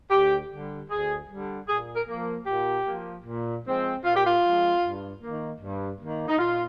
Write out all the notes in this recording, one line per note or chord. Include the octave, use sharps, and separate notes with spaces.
D2 G4
D3 G3
D2 G#4
D3 G3
A#2 G#4
A#4
F3 A#3
A#2 G4
F3 A#3
A#2
F3 G#3 C4
A#2 F4
G4
F4
F3 G#3 C4
G2
D#3 A#3
G2
D#3 A#3
D#4
A#2 F4